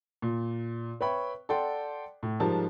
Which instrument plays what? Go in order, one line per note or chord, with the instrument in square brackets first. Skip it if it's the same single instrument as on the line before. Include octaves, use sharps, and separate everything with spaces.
[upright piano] A#2
B4 C#5 E5 G5 B5 C#6
A4 D5 F#5 G5 C6
A2
G#2 F3 G3 G#3 A#4 A5